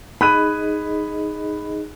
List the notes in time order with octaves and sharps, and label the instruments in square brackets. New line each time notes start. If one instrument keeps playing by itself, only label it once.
[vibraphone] D#4 G#4 D#5 [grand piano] B5 F#6 D#7